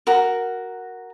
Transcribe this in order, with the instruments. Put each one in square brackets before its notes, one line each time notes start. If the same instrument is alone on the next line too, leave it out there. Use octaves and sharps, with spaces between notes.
[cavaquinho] F#4 A#4